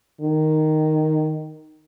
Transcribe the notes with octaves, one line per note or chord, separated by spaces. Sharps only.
D#3